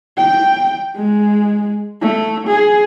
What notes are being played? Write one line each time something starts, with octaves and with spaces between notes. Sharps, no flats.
G5
G#3
A3
G#4